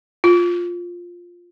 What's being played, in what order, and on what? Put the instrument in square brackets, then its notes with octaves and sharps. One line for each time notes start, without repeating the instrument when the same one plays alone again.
[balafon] F4